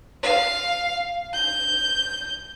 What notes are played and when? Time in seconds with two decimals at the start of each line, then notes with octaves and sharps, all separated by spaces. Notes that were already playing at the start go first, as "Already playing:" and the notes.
0.23 F5
1.34 G6